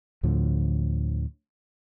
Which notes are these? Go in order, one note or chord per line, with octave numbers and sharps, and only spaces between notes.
D2 A2 D3 F3